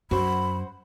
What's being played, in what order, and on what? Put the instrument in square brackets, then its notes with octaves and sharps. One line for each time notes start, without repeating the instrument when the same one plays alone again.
[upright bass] F#2 [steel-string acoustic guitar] F#4 C5 [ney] B5